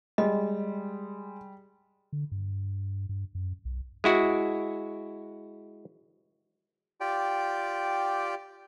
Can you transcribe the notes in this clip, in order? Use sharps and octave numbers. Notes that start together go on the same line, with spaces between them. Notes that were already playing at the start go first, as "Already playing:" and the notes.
G3 G#3 D#5
D3
G2
G2
F#2
B1
G#3 E4 F#4
F4 G4 D5 G5